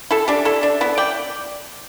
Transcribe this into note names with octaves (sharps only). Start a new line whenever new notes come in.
E4 A4
D4 G4
E4 A4
D4
B3 E4
D5 G5